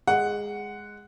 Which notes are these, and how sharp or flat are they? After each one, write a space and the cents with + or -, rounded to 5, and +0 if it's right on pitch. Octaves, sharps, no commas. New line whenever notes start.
G#3 -5 F#5 +0